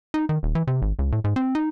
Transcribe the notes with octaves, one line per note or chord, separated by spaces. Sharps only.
D#4
D#3
D#1
E3
C3
G#1
C#2
A2
G#2
C4
D#4